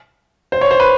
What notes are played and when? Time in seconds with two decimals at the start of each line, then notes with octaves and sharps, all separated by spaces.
0.52 C5
0.61 C#5
0.71 C5
0.80 B4